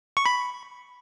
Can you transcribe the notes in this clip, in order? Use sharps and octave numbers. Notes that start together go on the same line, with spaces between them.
C#6
B5